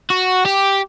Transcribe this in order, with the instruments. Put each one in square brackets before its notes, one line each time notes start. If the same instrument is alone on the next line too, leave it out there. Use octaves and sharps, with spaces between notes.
[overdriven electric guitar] F#4
G4